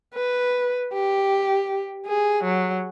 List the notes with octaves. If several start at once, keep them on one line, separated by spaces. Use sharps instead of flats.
B4
G4
G#4
F#3